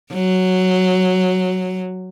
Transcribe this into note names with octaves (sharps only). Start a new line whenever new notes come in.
F#3